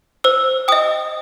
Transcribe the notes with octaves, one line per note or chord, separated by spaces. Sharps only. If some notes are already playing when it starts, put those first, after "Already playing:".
C5 E6
D#5 G5 D#6